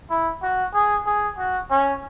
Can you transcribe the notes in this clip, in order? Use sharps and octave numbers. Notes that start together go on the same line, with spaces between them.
E4
F#4
G#4
G#4
F#4
C#4